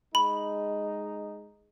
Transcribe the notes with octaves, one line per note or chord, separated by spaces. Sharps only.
G#3 D#4 B5